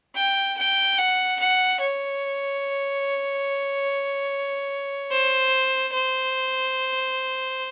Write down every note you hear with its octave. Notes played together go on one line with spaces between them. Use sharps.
G5
G5
F#5
F#5
C#5
C5
C5